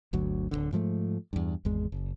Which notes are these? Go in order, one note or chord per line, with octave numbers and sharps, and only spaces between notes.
G1 D2 F#3
D1 G#1 D3
G#2 F3 G3 A3
E2 G2
G#1 E2 G#3
F#1